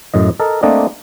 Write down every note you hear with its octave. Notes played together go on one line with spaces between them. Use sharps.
F#2 A2 D#5
A4 A#4 D#5
A3 A#3 C4 D4 D5 D#5